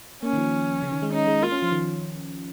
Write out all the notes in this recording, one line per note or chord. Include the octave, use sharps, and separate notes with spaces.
A#3 C#4
D#3
F3
C#3
D#3
G#3
C#4 D#4
G#3
A#3 F4
C#4
F3
D#3